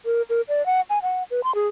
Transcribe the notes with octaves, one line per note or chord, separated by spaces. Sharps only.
A#4
A#4
D5
F#5
G#5
F#5
B4
C6
G#4